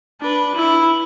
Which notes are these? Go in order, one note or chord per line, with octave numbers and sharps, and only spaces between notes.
D4 B4
E4